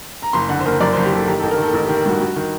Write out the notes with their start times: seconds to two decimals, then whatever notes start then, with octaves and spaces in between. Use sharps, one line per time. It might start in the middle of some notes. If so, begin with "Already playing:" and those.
0.22 A#5
0.33 F#1 C6
0.49 D3 F#5
0.61 C5
0.65 F#1 A#4
0.81 F#2 D5
0.93 F#1 C5
1.04 G4
1.12 F#1 A4
1.27 D#3 G4
1.40 A1 A4
1.51 A#4
1.58 D#3 A4
1.73 A1 A4
1.86 D#3 G4
2.06 G2 F#4
2.21 G2 F#4
2.36 D#3